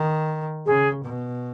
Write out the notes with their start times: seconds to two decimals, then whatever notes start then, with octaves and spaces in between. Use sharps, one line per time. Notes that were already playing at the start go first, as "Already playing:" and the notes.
Already playing: D#3
0.66 C#3 G#4
1.04 B2